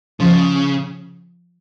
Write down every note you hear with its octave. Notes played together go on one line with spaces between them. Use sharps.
C#3 F3